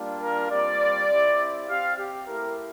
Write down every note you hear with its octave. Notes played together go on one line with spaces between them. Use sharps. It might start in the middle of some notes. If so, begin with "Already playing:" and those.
Already playing: G3 A#3 D4 F4
A#4
G3 C4 F4 D5
C4 E4 G4
C4 G4 F5
G4
A3 E4 G4 A#4